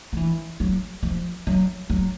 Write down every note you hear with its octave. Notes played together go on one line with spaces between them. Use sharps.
F3
E3
F#3
F3
F#3
F#3